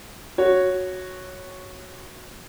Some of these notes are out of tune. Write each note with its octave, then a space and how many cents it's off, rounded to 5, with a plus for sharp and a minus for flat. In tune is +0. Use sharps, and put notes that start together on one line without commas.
F#4 -5 C#5 -5